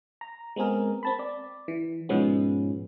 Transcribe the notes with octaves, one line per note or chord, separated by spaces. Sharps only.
A#5
G#3 B3 C4 G#4 A#4
C4 A5 B5
D5
E3
G#2 B2 F3 G#3 B3 C#4